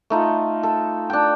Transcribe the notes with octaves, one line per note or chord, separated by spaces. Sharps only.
A3 D#4 F4
A4
D4 G5